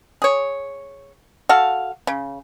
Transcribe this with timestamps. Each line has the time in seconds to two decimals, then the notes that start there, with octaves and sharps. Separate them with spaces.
0.22 G#4 C#5
1.49 F#4 A4 F5
2.07 C#3